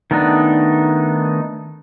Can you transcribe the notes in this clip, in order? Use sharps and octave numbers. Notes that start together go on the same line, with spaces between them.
D#3 A3 B3 D4 D#4